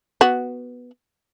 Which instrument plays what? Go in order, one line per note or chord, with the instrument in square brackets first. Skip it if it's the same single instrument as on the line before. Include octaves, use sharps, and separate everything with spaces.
[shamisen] B3 F#4